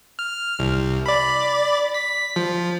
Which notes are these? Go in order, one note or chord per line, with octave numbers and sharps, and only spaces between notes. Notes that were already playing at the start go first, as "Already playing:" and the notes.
F6
C2
D5 B5
B6
F3